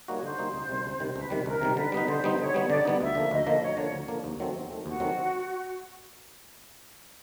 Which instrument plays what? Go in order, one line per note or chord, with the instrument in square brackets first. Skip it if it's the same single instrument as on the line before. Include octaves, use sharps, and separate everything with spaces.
[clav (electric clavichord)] G3 A#3 D#4 F#4 [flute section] C#5
[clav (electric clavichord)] D3 [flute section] C5
[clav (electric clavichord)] G3 A#3 D#4 F#4
C#2
C3 D#3 G3
C#2
C3 D#3 G3
[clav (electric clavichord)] C#2 [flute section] B4
[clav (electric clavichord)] C3 D#3 G3
[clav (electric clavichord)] C#2 [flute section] A#4
[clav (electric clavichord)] C3 D#3 G3
[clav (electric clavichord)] D3 [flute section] B4
[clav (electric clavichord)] G3 B3 D#4 [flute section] B4
[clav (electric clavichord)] D3 [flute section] C5
[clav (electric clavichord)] G3 B3 D#4
[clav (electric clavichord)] D3 [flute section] C#5
[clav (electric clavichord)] G3 B3 D#4
[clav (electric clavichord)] D3 [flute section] D5
[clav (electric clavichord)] G3 B3 D#4
[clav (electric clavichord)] D2 [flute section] E5
[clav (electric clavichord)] D3 F3 A#3
[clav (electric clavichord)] D2 [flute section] D#5
[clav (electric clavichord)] D3 F3 A#3
[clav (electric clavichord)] D2 [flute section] C#5
[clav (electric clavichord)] D3 F3 A#3
D2
D3 F3 A#3
D#2
D#3 F#3 A3 C4
D#2
D#3 F#3 A3 C4
[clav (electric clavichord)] D#2 [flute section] F#4
[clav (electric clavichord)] D#3 F#3 A3 C4